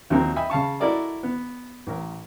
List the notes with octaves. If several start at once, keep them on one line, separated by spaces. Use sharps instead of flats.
D#2 F3 F#3 C4 D#4 A#4
D#5 E5 G5 G#5 B5 D#6
C#3 F5 A5 C#6
E4 F#4 A4 A#4 D5 D#5
B3
A1 A#4